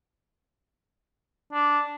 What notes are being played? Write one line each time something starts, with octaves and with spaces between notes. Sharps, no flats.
D4